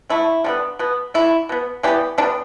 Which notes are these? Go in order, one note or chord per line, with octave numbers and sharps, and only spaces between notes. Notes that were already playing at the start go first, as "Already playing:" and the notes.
D3 A3 E4
D3 G3 B3
B2 B3
D3 A3 E4
B2 B3
E3 G3 B3 D4 G4
D3 G3 B3 D4